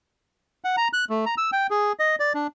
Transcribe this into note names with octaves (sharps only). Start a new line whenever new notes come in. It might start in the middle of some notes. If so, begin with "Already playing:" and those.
F#5
A#5
F#6
A3
A#5
E6
G5
G#4
D#5
D5
D4